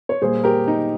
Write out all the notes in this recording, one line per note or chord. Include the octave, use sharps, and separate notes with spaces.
C#5
A#2 G3 A#3 G#4 C5
G4 A#4
D#4